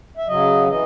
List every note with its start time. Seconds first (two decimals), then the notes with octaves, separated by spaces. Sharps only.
0.17 E5
0.28 C#3 F#3 D#5
0.68 E3 D#5